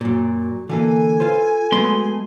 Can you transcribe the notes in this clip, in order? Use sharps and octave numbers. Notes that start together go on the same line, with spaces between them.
F#2 A#2 F#4
D3 E3 A#3 A4 G#5
F4 B4 C5
F#3 G#3 A3 B3 C6